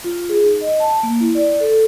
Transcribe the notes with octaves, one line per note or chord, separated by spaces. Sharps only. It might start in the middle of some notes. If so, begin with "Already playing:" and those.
F4
G#4
D#4
D#5
A5
A#3
E4
D5
A4